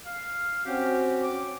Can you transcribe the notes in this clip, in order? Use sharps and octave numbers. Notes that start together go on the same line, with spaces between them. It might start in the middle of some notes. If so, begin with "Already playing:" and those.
F5
C4 C#4 F#4 G4
D6